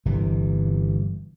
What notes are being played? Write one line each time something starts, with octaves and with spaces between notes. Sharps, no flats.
G1 C3 E3